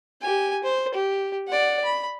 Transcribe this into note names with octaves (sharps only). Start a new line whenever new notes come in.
G4 G#5
C5
G4
D5 F#5
B5